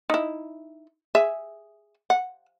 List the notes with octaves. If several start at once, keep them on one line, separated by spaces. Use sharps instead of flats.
D#4 E4
G#4 E5
F#5